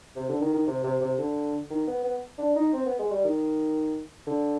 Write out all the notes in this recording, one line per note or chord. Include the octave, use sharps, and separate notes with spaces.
C3
D3
D#3
D#3
C3
C3
C3
D3
D#3
B3
B3
D4
D#4
C4
B3
G#3
G3
D#3
D3